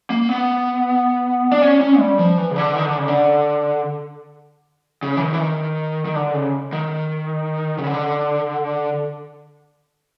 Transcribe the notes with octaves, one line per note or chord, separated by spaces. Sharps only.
A#3
B3
D4
C#4
C#4
G3
F3
E3
C#3
D3
D#3
D3
C#3
D3
C#3
E3
D#3
E3
D#3
D#3
D3
C#3
D#3
C#3
D3